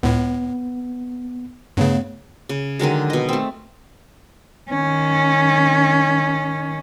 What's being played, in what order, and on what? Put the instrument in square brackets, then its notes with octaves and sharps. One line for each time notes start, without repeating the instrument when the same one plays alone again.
[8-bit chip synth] C#2 A2 [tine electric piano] B3
[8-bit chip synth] G2 C#3 [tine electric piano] A3 B3 C#5
[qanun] C#3
D3 D#3 F#3 G#3
B2 D#5
A3 C4
[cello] D#3 C#4